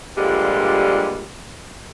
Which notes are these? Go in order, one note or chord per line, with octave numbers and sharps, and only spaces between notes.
G2 A#2 D3 F3 G3 G#3